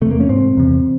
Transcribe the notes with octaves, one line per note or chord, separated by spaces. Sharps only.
E2 C3 A3
A#3
C#4
G#2 C4
E2 C3